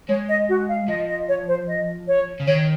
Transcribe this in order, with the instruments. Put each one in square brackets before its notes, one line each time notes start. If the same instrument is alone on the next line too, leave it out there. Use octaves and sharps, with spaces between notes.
[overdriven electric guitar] G#3 [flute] C#5
[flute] D#5
F#4
F5
[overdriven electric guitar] F3 [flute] D#5
[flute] D#5
C#5
C5
D#5
C#5
[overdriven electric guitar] C#3
[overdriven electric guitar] D#3 [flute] C#5